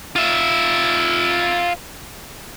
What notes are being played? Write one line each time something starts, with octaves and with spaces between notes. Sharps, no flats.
F4 E5